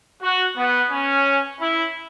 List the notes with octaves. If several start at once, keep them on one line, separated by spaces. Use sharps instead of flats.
F#4
B3
C#4
E4